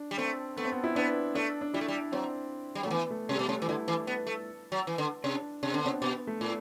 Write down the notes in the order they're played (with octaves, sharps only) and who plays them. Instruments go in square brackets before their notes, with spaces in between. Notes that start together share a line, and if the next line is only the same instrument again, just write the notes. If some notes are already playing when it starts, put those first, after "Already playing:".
Already playing: [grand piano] D4
[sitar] G3
[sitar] A3 [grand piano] C4
[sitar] A3 [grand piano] B3
[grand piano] C4
B3
E4
[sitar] B3 [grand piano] D4
[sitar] A3 [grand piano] D4
[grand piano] D4
[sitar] G3 [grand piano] E4
[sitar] A3
G3
[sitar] F#3 [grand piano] C4
[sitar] G3
F#3
[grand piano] A3
[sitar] E3 [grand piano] B3
[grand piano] A3
[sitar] C3 [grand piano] G3
[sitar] B2
[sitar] C3 [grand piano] A3
[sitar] E3
[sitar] D3 [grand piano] E4
[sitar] E3
B3
A3
F#3
E3
D3
[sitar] C3 [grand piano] D4
[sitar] C3 [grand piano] D4
[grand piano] C4
[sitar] D3 [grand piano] B3
[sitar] C3 [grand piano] C4
[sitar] B2 [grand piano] B3
[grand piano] A3
[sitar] A2